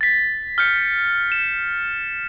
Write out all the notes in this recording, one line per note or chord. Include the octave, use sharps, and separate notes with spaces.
A6 B6
F6 G6 C#7
E7